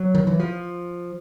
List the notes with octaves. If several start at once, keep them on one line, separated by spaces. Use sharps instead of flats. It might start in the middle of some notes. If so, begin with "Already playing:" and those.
Already playing: F#3
D#3
E3
F3